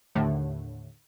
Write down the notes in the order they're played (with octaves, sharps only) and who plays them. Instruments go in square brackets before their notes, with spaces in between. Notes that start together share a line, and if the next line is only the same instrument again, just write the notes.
[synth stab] D#2 A2 D3